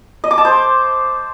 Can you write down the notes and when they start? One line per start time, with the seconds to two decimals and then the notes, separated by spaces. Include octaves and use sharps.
0.24 D#5
0.31 D6
0.38 A5
0.45 C5